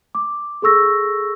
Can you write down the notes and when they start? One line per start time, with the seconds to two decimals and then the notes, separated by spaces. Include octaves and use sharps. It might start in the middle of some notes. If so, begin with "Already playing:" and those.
0.15 D6
0.62 G#4 A4 C#6 E6 A#6